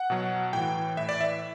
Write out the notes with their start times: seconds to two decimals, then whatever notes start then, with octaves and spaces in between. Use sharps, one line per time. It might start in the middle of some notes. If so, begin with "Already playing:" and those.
Already playing: F#5
0.10 B2 F#3
0.53 A2 E3 G5
0.97 A2 E3 E5
1.09 D5
1.21 E5